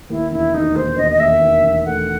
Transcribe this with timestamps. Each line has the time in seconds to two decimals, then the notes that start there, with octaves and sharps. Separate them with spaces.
0.10 D#2 E4
0.32 E1 E4
0.54 E1 D#4
0.76 D#2 C5
0.98 E1 D#5
1.12 D#5
1.20 D#2 E5
1.41 D#3
1.64 E1
1.85 A3 F#5